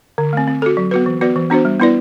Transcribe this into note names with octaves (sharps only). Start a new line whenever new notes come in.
D3
A3 C4
C4
F#4 A4
F#3
B3 F#4 B4
E3
B3 F#4 B4 D5
E3
B3 D4 F#4 C5
G3
B3 E4 B4 D5